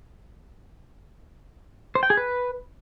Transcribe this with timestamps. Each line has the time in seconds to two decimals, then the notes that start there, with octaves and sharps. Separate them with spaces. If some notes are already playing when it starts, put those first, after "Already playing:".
1.95 C5
2.03 G5
2.10 G#4
2.17 B4